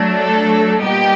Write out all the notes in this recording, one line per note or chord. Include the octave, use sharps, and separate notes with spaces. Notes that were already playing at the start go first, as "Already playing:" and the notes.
Already playing: F#3 A3 D4
A4
A#2 G3 B3 D#4 G4